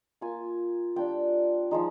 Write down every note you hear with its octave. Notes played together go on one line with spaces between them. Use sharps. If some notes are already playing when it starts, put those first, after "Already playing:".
A#3 F4 G#5
G3 D4 F4 G5
F3 G#3 D#4